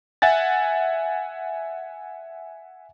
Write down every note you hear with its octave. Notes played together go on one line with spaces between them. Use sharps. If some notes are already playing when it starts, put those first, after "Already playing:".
E5 F#5 G#5 A6